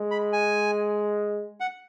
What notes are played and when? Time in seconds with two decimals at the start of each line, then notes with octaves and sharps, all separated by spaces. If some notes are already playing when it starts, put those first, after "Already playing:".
Already playing: G#3
0.11 B5
0.33 G#5
1.60 F#5